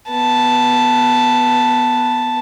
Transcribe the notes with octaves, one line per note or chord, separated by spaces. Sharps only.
B3 A5